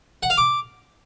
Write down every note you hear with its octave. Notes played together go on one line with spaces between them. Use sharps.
F#5
F5
D6